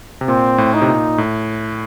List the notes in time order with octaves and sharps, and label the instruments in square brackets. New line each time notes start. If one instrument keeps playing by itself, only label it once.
[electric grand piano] C3
[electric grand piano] A#2 [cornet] C4
[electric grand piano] A2
[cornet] D#4
[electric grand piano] C3
A#2
A2